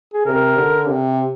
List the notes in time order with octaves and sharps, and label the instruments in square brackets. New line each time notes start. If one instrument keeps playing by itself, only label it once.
[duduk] G#4
[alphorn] C3 [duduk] A#4
[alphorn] D3
C3